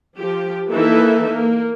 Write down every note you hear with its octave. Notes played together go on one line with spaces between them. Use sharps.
F3 G4
E3 A#3 D#4 A4 B4 E5
A#3